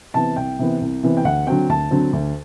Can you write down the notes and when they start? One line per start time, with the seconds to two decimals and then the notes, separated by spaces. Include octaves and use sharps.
0.14 C3 E3 B3 A5
0.36 C2 G5
0.59 C3 E3 B3
0.81 C2
1.03 C3 E3 B3
1.17 G5
1.25 D2 F#5
1.47 D3 F#3 C4 G5
1.69 D2 A5
1.91 D3 F#3 C4
2.13 D2